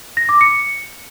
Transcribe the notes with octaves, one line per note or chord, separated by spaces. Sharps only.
A#6
D6
C#7